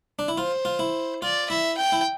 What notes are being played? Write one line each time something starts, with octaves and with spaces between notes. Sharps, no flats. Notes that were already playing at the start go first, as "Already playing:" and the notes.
D4
E4
F4 C5
F4
E4
F4 D5
E4 E5
G5
E4